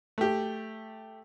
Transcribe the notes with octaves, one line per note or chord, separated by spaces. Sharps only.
A3 G4